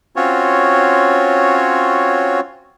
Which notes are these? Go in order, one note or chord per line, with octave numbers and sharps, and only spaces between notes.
C4 C#4 F4 F#4 C#5